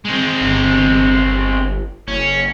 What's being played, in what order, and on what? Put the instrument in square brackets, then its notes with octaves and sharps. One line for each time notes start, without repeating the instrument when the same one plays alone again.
[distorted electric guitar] G#3 C4
[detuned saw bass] G1
[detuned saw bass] F#1 [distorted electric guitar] C#4